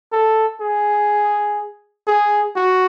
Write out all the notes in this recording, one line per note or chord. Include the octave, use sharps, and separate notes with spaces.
A4
G#4
G#4
F#4